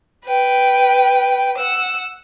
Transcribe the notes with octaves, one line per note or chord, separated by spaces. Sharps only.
B4 G5
F#5 E6